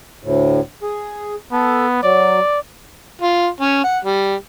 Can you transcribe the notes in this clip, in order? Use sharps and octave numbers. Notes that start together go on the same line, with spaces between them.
D2 A2
G#4
B3 A4
F#3 D5
F4
C#4
F#5
G3